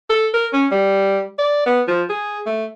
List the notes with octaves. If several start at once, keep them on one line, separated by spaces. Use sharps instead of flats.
A4
A#4
C#4
G3
D5
B3
F3
G#4
A3